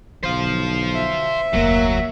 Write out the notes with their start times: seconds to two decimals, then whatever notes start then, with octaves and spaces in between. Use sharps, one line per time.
0.23 B1 D3 C5 F5
0.95 E5
1.53 F1 D2 F#3 A#3